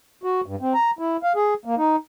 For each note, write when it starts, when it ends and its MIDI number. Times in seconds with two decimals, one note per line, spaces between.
0.23 0.41 66
0.46 0.56 43
0.61 0.73 60
0.74 0.91 82
0.99 1.17 64
1.23 1.33 77
1.36 1.54 68
1.65 1.75 58
1.78 1.96 63